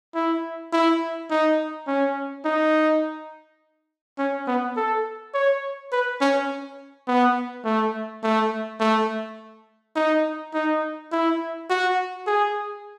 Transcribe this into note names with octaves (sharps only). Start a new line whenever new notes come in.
E4
E4
D#4
C#4
D#4
C#4
B3
A4
C#5
B4
C#4
B3
A3
A3
A3
D#4
D#4
E4
F#4
G#4